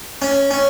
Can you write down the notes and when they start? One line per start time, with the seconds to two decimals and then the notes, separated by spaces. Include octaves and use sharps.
0.22 C#4
0.51 C#4